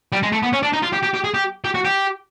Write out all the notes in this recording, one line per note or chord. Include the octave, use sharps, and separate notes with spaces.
G3
G#3
A3
B3
C#4
D4
D#4
F4
G4
G4
G4
G#4
G4
G4
F#4
G4